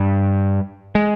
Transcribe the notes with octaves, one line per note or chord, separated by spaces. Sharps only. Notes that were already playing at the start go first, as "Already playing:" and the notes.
Already playing: G2 G3
G#3